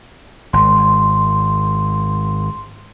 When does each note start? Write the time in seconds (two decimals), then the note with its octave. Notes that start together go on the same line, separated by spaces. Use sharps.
0.53 G#1 C6